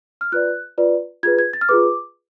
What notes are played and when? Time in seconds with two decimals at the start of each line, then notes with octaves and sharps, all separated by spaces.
0.21 F6
0.32 F4 B4 D5 F#6
0.78 F4 B4 D5
1.23 F4 G#4 B4 G#6
1.39 G#6
1.53 A6
1.61 F6
1.69 F4 G#4 B4 D6